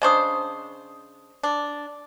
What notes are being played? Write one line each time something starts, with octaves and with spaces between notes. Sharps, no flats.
C#3 D4 C5 D#5 C#6 D#6
D4